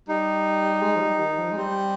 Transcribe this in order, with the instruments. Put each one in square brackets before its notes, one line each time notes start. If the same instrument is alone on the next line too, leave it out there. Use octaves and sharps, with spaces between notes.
[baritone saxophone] G3 [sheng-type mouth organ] D#4
[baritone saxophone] G#3
F3
G3
D#3
F3
G#3
[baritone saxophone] G3 [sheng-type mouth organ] C4